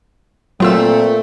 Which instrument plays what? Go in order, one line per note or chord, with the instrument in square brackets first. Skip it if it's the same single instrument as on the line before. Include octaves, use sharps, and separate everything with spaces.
[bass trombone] A#2 [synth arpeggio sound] F#3 F4 E6 [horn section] A3 [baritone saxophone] C4